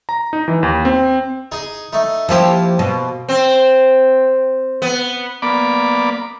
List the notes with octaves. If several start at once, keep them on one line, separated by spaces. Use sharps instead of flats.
A#5
D#4
E3
D#2
C4
D#4 G#4
A3 D#4
F3 A#3 E4 G4 C5
B2
C4
B3
A#3 B3 D5 B5 D6